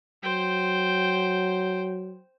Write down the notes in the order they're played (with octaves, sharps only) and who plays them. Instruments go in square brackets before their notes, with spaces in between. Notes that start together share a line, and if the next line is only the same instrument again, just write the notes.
[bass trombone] F#3 [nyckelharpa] C5 G5